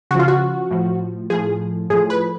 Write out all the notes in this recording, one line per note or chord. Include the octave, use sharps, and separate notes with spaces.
C#3 F3 F4 F#4
F#4
A2 F3
A2 F3 G#4
A2 F3 G#4
B4